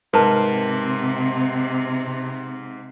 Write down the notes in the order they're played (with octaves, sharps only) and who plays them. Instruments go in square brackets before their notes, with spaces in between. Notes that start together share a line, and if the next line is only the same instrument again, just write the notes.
[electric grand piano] G#2 [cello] C3 C4 [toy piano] A#4 B4 A5